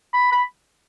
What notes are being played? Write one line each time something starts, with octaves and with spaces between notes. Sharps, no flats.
B5
B5